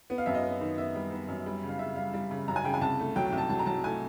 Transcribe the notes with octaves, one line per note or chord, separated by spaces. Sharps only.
B3
F5
F#2 E5
D#5
B3
D#3
B3 E5
G3
B3
F#2
G3
C#3
F5
C#3 E5
G3 F5
G3
C#3
F#2 A#5
G#5
C#3 G5
G#5
C2 A5
A3
F#3 G5
G5
C2
A5
F#3 A5
A#5
F#3 A5
A3 G#5